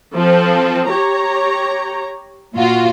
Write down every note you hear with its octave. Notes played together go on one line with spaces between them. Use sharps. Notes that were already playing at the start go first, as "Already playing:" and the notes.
F3 C4 A4
G4 C#5 A#5
A#2 F4 F#4